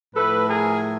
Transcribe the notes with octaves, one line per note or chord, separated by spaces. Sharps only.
A2 F3 A3 A4 B4
G#4 A#4